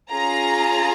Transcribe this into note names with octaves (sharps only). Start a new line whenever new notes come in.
C#4 F4 G#4 A#5